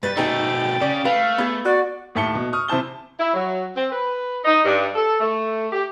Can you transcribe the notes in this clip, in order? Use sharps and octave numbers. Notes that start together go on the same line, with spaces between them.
G2 G3 B4 A6
B2 A3 D#4 G#4 G5
C#3 D5
A3 B4 F5
B3 G#4
F#4 D5
D#2 A2 E5 A5 C#7 G7
B2
C#6 D#6 F6
C3 E4 C5 A5 G7
E4
F#3
C4
B4
D#4
G2
A4
A3
G4